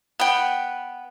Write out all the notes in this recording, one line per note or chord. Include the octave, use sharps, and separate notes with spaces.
B3 G5